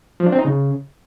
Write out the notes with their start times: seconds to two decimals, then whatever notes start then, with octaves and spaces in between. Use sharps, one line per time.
0.20 F3
0.26 D4
0.32 C4
0.39 D#4
0.45 C#3